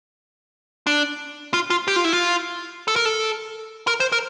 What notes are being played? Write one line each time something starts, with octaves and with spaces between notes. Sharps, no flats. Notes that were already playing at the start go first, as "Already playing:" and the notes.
D4
F4
F4
G4
F4
E4
F4
A4
A#4
A4
A#4
C5
A#4